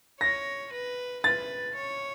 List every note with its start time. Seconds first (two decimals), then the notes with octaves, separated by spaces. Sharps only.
0.20 C#5 A#6
0.73 B4
1.24 B4 A6
1.76 C#5